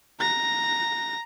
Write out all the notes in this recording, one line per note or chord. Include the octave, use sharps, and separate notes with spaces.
A#5 A#6